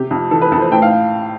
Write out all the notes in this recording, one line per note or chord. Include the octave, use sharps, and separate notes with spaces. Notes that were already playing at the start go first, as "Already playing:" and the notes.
Already playing: C3 G4
F2
E3 A4
B4
F2 A4
C5
A2 G5
F5